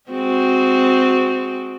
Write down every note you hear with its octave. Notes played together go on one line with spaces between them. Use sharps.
G#3 C4 F#4